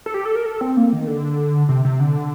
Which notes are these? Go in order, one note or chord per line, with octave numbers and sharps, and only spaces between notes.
A4
G4
A4
A#4
A4
C4
A#3
D#3
D3
C3
C3
D3